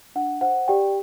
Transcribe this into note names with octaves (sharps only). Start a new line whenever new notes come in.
D4 F#5
C5 F#5
G4 D5 G5